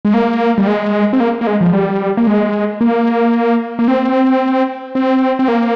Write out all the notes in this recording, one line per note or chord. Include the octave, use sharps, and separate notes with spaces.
G#3
A#3
G3
G#3
C4
A#3
A#3
G#3
F3
G3
A#3
G#3
A#3
A#3
C4
C4
C4
A#3